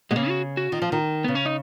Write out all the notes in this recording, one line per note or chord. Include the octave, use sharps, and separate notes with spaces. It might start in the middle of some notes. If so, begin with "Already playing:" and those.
B2 G#3
C#3 A#3
F#4
F#4
D#3 F4
F3
D#3
C#3 B3
C#4
D#4